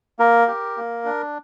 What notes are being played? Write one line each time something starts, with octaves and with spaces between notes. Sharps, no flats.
A#3 A#4
G4
A#3
D4